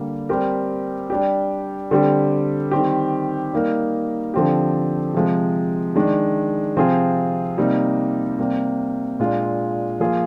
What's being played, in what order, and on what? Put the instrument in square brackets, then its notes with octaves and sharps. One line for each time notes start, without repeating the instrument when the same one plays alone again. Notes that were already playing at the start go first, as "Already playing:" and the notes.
Already playing: [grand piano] D3 G3 A#3
G3 C4 G4 A#4
G3 D4 G4
D3 G3 C4 G4
D#3 G3 C4 G4
G3 A#3 D#4 A#4
D3 F3 C4 G4
C3 F3 G#3
D#3 G#3 D4
C3 F3 C4 F4 G#4
C3 G3 A#3 D#4
C3 G3 A#3
A#2 G#3 D4 F4
F3 A#3 F4 G#4